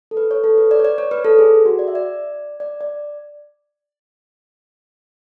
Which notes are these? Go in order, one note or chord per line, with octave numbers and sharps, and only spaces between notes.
A4
B4
C#5
A4
B4
D5
C#5
D5
C#5
B4
A4
G#4
F#4
D5
E5
D5
D5
D5